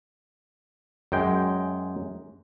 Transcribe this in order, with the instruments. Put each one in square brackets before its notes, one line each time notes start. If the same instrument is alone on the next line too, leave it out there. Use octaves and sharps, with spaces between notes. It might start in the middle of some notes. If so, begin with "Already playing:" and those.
[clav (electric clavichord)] F#2 G#3 G5